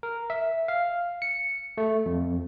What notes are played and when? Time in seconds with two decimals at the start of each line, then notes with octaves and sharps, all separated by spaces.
0.03 A#4
0.30 E5
0.68 F5
1.22 C#7
1.78 A3
2.06 F2